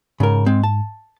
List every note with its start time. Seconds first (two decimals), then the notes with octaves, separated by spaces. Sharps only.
0.20 G#2 C#3 A#4
0.46 G#3 C4
0.63 A5